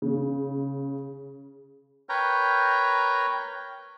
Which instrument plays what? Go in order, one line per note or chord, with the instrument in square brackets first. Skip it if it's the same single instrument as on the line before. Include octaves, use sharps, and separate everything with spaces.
[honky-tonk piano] C#3
[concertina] A#4 B4 C#5 G5 A#5